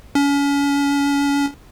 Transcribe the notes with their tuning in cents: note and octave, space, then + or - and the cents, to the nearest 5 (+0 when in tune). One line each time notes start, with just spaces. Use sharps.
C#4 +35